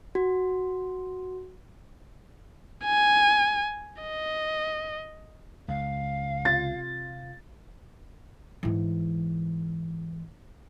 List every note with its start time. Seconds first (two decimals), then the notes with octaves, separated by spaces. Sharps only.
0.15 F#4
2.85 G#5
4.02 D#5
5.68 C#2 F5
6.45 C3 F4 A6
8.63 G#2 E3